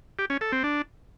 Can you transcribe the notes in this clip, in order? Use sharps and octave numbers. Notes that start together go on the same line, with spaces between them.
G4
C#4
A4
C4
D4